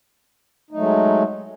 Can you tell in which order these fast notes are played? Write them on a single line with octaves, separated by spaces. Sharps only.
D#4 A3 F#3 G#3